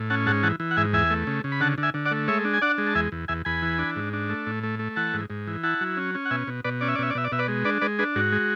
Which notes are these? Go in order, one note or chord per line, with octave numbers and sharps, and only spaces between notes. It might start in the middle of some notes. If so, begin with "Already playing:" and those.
Already playing: A2
C#4 F#5 A5
G#2 F#5 A5
E3 F#5 A5
E3
F#5
G#2 E5 G#5
E2 E5 G#5
A3
C#3
C#3
B5
D3 F#5 A5
D3
E5 G#5
D3
D5 F#5
A3
G#3 C#5 E5
D4
G#5
D4 D5 F#5
G#3
A5
E2 E5 G#5
E2
E2 E5 G#5
E2 G#5 B5
E3
D4
G#2
D4
A3
A2
A3
A3
E3 F#5 A5
G#2
G#2
E3
E4 F#5 A5
F#3
C#4
C#4
F#5
B2 E5 G#5
B2
B2 B4 D5
C#4 D5
E5
D5
B2 E5
D5
B2 E5
D5
B2 E5
B4 D5
G#3
D4 B4 D5
G#3 B4 D5
D4 G#4 B4
G#2 F#4
G#3